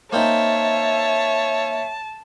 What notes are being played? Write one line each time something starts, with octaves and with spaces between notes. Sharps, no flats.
A#3 C4 D#4 C#5 E5 A5